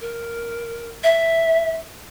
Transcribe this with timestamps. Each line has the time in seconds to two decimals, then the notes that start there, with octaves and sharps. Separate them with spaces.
0.01 A#4
1.03 E5